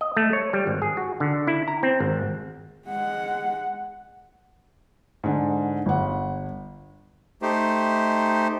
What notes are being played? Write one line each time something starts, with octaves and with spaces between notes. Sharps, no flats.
D#5
A3
C#5
G3
G#1
G#4
F#4
D3
E4
A#5
C4
G#1
G#3 F#5
G#2 D3
G1 F#5
A3 D#4 G4 C5